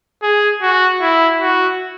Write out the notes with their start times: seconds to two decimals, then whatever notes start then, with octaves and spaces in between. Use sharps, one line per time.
0.23 G#4
0.62 F#4
1.02 E4
1.41 F#4